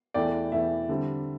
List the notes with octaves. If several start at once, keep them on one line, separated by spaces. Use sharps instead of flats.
E2 E3 A3 D5 G5
E2 E3 A3 E5
D3 G3 C4